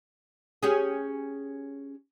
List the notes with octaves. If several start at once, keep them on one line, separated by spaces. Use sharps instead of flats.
C#4 G4 G#4